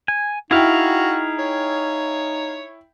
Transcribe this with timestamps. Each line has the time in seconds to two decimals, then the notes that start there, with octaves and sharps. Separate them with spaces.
0.08 G#5
0.51 D#4 E4 F#4 G#4 F5 G5
1.39 C#5